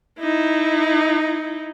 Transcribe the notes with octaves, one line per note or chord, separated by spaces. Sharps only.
D#4 E4